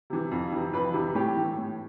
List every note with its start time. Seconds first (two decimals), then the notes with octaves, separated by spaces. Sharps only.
0.10 C3 E3
0.31 F2
0.52 C3 E3
0.73 F2 B4
0.94 C3 E3
1.15 A2 G4
1.37 E3
1.58 A2